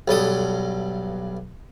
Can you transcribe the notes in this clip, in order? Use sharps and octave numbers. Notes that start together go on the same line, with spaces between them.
B1 G2 A4 D#6